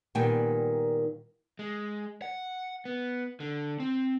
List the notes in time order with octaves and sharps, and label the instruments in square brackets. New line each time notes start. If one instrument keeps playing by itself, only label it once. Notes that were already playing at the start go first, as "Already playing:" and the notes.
[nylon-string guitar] A#2 D#3 G3 B3 G5 G#5
[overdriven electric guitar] G#3
F#5
B3
D3
C4